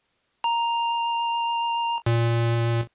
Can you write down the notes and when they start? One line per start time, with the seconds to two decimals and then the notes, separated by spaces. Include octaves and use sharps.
0.44 A#5
2.06 A#2